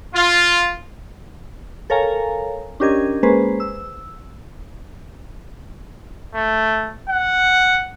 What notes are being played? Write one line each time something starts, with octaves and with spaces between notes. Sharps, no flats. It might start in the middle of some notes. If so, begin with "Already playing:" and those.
F4
A4 A#4 C#5 F5 G#5 A#5
C#4 D4 G4 A#4 D#5 G#6
G#3 A#3 C#4 G#4 B4 C5
E6
A3
F#5